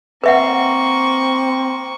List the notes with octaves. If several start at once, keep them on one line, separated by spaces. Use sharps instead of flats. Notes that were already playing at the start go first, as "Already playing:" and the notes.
A#3 C4 B4 E5 F#5 C#6